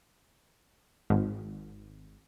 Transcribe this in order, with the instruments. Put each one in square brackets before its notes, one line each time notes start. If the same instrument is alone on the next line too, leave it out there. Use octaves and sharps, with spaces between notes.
[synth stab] G#1